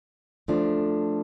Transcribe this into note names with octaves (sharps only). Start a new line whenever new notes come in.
F3 A3 D4